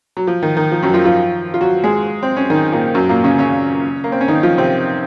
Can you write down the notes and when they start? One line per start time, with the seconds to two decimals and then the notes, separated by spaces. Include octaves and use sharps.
0.17 F#3
0.27 F3
0.43 D#3
0.57 D#3
0.72 F3
0.83 F#2 F#3
0.94 F3 F4
1.05 F3 F4
1.54 F4
1.61 F#3 F#4
1.84 G#3 G#4
2.23 C4
2.37 C#4
2.50 D#3 D#4
2.72 A#2 A#3
2.95 F#2 F#3
3.09 A#2 A#3
3.24 C#3 C#4
3.39 C#3 C#4
4.04 A#3
4.12 C4
4.21 C#4
4.28 D#3 D#4
4.43 F3 F4
4.58 C3 C4